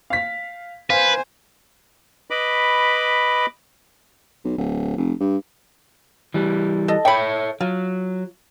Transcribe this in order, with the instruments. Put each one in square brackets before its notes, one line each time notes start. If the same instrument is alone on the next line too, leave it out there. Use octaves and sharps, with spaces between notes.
[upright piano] F5 B6
[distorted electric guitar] B4 [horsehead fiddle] C5 G#5 [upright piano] F5
[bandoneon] B4 D#5 B5 D6
[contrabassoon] B1
D1
F1
G2
[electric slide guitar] E3 G3
[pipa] A4 D#5
[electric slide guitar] A4 C#5 E5 [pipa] G5 B5
[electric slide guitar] F#3 [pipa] F4